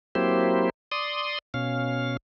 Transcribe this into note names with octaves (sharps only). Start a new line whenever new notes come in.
F#3 A#3 C4 E4 G4 C5
D5 C6 D#6
B2 C#4 F5